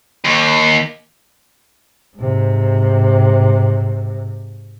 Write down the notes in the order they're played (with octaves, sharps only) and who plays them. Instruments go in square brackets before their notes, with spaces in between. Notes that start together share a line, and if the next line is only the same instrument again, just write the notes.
[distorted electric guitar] D#2
[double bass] G#2 C3